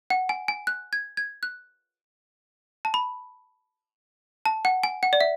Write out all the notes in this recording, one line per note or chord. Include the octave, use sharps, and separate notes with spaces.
F#5
G#5
G#5
F#6
G#6
G#6
F#6
A5
B5
A5
F#5
G#5
F#5
D5
E5